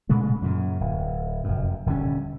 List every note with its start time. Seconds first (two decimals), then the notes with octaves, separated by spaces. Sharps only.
0.09 A#2 C#3 G#3 A3
0.42 F#2 A#2 C#3
0.81 D1
1.44 F1 F#2
1.86 D#1 D3 G3 C#4